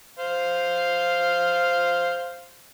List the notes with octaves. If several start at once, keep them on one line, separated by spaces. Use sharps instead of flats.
C5 F5